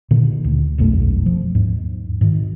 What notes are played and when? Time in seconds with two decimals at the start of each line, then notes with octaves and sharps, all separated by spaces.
0.11 A#2 D3 D#3
0.44 D2
0.78 E1 B1 F#2 A3
1.26 F3
1.55 D#2 G#2
2.21 G#2 D#3